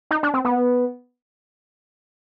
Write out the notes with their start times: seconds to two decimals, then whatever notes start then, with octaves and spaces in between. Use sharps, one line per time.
0.11 D#4
0.23 D4
0.34 C4
0.45 B3